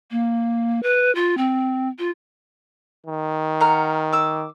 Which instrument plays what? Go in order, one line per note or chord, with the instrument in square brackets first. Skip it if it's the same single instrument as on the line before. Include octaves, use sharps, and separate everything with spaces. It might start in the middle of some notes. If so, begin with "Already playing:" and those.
[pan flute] A#3
B4
F4
C4
F4
[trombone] D#3
[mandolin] F#5 A#5 F6
D6 E6